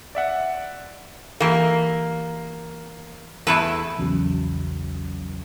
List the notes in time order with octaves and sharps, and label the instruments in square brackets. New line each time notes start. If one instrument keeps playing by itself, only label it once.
[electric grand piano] D5 E5 F#5
[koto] E3 G4 [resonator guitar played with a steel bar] A#3
[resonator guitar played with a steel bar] E2 [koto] A3 E4 B4
[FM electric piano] A#1 E2 C#3 F#3